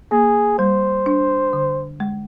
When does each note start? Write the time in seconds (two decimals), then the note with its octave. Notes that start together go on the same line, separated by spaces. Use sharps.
0.12 A#3 G#4
0.59 G3 C5
1.06 D4
1.53 D3
2.00 G#3